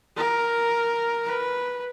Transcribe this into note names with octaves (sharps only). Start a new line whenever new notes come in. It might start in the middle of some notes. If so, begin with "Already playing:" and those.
A#4
B4